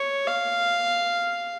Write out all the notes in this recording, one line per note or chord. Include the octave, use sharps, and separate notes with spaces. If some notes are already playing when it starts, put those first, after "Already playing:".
Already playing: C#5
F5